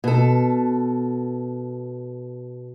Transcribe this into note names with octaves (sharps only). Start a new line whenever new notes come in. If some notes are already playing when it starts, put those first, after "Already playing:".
B2 A4